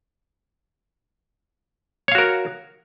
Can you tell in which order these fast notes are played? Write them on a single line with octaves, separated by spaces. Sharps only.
C#5 F5 F#4 A#4